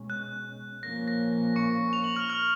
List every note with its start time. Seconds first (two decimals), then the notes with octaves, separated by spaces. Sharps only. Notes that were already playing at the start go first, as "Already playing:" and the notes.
Already playing: B2 G#3 C#4
0.10 F#6
0.83 A#2 F3 A#3 C#4 A#6
1.08 A#6
1.56 C#6 C#7
1.93 F7
2.04 F#7
2.16 F6 F7
2.29 F6 F7